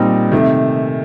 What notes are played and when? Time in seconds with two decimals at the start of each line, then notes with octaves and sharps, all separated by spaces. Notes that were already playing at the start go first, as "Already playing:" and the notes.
Already playing: A#2 G3 C4 D#4
0.31 C3 D#3 A3